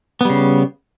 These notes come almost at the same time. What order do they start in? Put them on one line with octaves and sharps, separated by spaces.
B3 G3 C#3